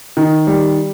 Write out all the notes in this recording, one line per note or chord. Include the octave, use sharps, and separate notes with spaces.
D#3
G3